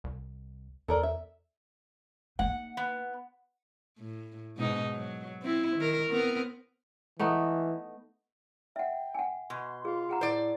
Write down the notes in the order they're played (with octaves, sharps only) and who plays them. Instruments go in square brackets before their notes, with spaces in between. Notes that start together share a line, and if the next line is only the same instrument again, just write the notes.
[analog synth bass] C2
[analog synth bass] E2 [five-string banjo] A4 A#4 D5
[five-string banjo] E5
[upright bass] A#3 D#4 [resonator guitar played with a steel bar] F#5
[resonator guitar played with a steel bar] B3
[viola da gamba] A2
G#2 B2 D#4
F#3
C4 E4
D#3 A#4
B3 C4 A#4
[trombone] E3 [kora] A3 B3 D#4
[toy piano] E5 F#5 [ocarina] G5
[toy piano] F#5 G#5
[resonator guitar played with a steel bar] B2 [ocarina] C6
[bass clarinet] F4 [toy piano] G#4
[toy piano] G#4 F#5 A#5
[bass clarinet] A2 [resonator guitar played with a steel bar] C5 D5